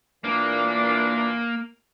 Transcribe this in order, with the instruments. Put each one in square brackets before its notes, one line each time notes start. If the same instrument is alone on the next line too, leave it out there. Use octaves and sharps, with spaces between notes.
[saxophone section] A#2 E3 D4 [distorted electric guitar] A#3